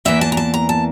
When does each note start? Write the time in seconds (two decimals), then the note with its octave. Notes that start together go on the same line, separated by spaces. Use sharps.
0.05 E2 E3 A#3 E5
0.21 A5
0.32 A#5
0.37 A5
0.54 A#5
0.69 A5